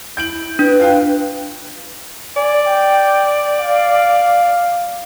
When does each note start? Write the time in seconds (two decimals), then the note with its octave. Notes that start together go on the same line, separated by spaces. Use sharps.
0.17 E4 G6 D7 F#7
0.59 D4 B4
0.79 F4 F5 G5
2.36 D5 G#5
2.67 G5
3.60 F5